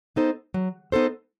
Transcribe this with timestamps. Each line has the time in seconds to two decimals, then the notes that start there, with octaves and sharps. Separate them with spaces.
0.16 B3 D#4 A4 C5
0.54 F#3
0.92 B3 D#4 A4 C5